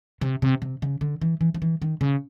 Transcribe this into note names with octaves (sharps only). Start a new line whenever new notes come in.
C3
C3
C3
C#3
D3
E3
E3
F3
E3
D#3
C#3